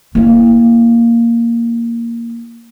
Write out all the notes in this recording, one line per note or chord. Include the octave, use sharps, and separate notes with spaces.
A#3 E4